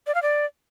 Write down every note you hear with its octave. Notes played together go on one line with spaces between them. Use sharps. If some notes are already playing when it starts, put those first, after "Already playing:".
D5
F5
D5